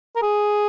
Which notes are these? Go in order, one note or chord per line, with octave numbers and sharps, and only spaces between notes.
A#4
G#4